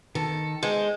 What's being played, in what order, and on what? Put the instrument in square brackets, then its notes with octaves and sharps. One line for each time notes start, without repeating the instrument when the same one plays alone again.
[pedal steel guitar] D#3 [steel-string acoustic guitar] A4
[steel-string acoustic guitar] G#3 [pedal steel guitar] C5